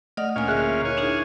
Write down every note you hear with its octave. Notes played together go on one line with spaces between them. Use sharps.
A3 D5 D#5 F#5 F6
D2 A#2 C#4 F5 G#5
D3 G#4 E5 F#6
E4 A#4 C#5 F5 G#5 C#6
D4 D#4 G#4